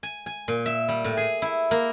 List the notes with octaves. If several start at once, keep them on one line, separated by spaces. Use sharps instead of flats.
G#5
G#5
A#2
E5
G3
A2
G#4
E4
A#3